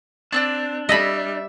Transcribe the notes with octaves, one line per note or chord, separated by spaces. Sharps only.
C4 D4 D5 E6 F#6
G3 D#5 E5 A5 B5